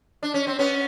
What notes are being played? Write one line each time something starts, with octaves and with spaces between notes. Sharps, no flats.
D4
C#4
C4
B3 C#4